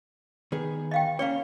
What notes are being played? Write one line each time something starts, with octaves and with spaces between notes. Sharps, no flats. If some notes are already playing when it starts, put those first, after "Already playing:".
D#3 B3 G#4
D#5 F5 G5
A#3 C#4 C#5 D5 F5